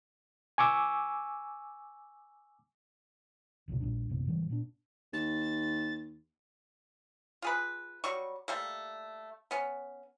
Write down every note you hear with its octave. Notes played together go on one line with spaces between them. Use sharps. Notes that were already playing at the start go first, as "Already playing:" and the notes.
G#5 C#6 D6 E6
F1 C#2 A2 C3
A#1 A#2 G3 D4
A#1 F#2 C3 B3
G#2 C#3 E3 G3
A#2 B3 D4
D#2 A6
F4 G#4 B4
F#3 G3 C#6
G3 A3 A#3
B3 C#4